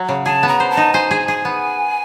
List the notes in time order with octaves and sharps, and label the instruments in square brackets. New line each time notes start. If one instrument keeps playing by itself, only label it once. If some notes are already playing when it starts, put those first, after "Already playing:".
Already playing: [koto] F#3
C#3
[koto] G#4 [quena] A5
[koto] B3
[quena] A#5
[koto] C5
[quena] A5
[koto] D#4
[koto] C5 [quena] G#5
[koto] G#4
[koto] G#4 [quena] G#5
[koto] B3